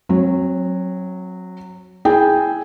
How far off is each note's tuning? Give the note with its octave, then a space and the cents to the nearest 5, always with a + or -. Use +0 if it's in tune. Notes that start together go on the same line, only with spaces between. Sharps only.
F#3 -10 C4 +30
E4 -10 G#4 +0 G5 +0